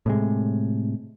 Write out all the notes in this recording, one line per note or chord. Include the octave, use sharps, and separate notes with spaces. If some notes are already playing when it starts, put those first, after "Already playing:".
A2 C3 G#3